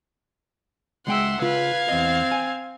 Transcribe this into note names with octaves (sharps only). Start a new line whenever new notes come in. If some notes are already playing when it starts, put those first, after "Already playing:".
C#2 G#3 E5 F#5 G5 C6
C#3 F4 B4 F5 G#6
E2 C4 D#5
G#5